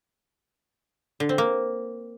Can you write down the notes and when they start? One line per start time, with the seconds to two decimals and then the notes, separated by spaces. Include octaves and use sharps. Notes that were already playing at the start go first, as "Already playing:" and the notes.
1.20 D3
1.29 C4
1.38 A#3